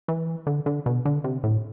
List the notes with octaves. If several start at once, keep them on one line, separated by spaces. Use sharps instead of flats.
E3
D3
D3
B2
D3
C3
A2